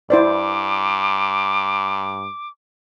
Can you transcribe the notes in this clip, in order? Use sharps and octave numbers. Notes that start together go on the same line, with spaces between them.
G2 E4 C5 D5 D6